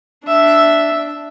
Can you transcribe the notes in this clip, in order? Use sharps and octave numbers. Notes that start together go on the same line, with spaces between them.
D4 E5